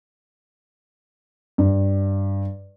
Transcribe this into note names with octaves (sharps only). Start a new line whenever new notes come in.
G2